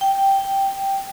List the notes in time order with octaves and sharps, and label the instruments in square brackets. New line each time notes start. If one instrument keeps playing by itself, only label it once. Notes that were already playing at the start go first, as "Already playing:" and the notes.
[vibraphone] G5